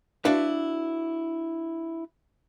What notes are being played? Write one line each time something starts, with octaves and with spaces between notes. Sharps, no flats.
D4 E4 F#4 B4 F5